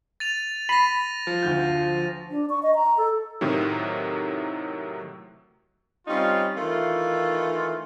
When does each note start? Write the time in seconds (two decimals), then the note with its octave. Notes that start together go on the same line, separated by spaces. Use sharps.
0.20 A6 D#7 F7
0.69 B5 A#6 C7 D#7
1.27 F3
1.43 D2 D3 G6
2.30 D4
2.50 C#6
2.63 D#5
2.75 A#5
2.97 A4
3.41 A2 C3 D#3 F#3
6.08 G3 C4 C#4 D#4 F4
6.56 D#3 E3 A3 F4